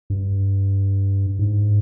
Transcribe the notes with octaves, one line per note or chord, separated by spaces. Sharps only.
G2
G#2